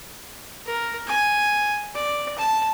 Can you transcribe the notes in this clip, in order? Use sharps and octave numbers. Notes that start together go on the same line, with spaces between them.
A#4
G#5
D5
A5